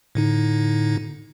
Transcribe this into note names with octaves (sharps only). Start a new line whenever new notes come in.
A2 D3 D#4